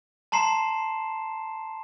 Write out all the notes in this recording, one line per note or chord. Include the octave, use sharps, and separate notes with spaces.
A5 A#5 C6 C7 E7